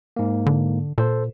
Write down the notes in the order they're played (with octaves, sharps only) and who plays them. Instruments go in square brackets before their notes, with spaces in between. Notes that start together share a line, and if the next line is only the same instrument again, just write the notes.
[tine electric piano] G#2 A#3
[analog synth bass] D3
[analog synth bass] A#2 [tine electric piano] A4 C5